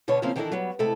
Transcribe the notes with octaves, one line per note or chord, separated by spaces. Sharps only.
B2 D3 B3 B4 C#5
C#3 F3 A#3 C4 C#4 E4
D#3 E3 D4 E4 A4 D#5
F#3 G3 B3
C3 G#3 A3 E4 A4